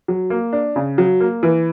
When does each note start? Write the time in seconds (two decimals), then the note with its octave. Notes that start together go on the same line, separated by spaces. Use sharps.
0.08 F#3
0.30 A#3
0.53 D4
0.76 C#3
0.98 F#3
1.20 A#3
1.43 E3